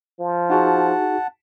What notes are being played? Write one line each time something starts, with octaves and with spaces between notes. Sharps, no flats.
F3
D#4 F#4 G#4 F#5 A5